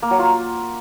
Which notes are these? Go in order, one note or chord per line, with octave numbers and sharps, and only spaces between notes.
A#3
F#3
F4